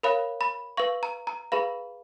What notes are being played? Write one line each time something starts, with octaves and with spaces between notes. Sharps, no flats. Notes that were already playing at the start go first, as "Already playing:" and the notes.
A#4 C#5 F5 B5
B5
B4 F5 C#6
A#5
A#5
G#4 B4 F5 B5